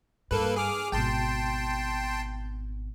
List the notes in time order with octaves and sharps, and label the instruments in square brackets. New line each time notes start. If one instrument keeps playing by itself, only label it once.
[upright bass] G2 [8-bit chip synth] A#3 A4 B4
[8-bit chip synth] G#4 D6 F6
[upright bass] G#1 B2 [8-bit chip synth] G5 A5 C6